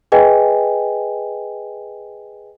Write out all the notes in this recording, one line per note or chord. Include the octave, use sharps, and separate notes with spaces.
G#4 B4 D#5 G5 G#5